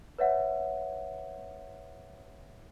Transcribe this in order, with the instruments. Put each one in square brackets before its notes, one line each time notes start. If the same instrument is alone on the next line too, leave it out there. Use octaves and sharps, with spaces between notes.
[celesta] B4 C#5 E5 F#5